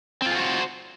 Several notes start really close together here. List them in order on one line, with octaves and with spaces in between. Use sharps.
C4 F4 G#4 F#4 C5